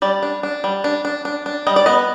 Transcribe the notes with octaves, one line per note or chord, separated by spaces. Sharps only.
G3 D5
D4
D4
G3
D4
D4
D4
D4
G3 D#5
D5
B3 D#5